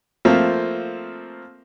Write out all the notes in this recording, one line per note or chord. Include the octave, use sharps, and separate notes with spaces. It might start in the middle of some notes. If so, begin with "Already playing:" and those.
F3 A3 A#3 C4